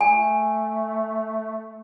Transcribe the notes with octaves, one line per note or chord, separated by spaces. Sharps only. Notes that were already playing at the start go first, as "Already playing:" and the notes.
A3 G#5